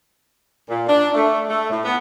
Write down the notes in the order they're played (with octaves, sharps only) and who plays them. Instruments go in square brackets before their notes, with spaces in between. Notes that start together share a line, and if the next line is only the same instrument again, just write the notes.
[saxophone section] A#2
D4
A3
A3
A2
B3